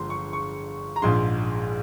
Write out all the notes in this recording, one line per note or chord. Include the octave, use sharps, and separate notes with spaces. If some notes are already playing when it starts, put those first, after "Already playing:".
Already playing: G1 G2 F3 G#3 C6
C#6
C#6
A#5
A#1 G#2 F3 G#3 C6